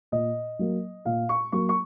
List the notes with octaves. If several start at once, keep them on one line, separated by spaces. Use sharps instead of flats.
A#2 D#5
F#3 A#3
A#2 F5
C#6
F#3 A#3 C#6
C#6